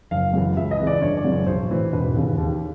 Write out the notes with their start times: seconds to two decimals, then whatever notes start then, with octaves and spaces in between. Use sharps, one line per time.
0.11 F#1 F5
0.34 F#2 C#3 E3
0.57 C#2 E5
0.71 D#5
0.79 C#3 E3
0.87 D5
1.01 G1 C#5
1.17 D5
1.24 F#2 C#3 E3
1.32 C#5
1.47 B1 C5
1.70 A2 E3
1.93 E1 B4
2.15 D#2 C#3 E3
2.38 D#2